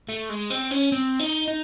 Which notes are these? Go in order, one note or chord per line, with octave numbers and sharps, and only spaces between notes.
A3
G#3
C4
C#4
C4
D#4
D#4